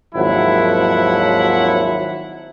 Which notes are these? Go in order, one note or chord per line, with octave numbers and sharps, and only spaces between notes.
G#1 D#2 F3 F#3 E4 F#5